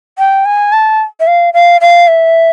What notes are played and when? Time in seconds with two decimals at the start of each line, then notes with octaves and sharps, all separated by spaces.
0.19 G5
0.46 G#5
0.73 A5
1.20 E5
1.27 F5
1.54 F5
1.81 F5
2.08 E5